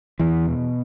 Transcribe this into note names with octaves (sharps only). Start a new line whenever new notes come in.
E2 E3
B2